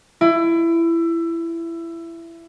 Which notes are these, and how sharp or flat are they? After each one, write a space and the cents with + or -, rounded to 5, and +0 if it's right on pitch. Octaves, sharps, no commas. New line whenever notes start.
E4 +20